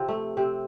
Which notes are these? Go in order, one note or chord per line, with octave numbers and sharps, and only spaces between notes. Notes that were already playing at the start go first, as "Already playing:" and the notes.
Already playing: C3 F3 C4
A3
C3 C4